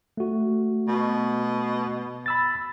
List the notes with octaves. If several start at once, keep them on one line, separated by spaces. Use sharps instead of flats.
A3 F#4
B2
B5 E6 A6